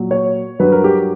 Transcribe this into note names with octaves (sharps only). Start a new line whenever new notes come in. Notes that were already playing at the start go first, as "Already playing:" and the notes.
Already playing: A#2 F#3
C#5
G2 F#3 B4
A#4
G4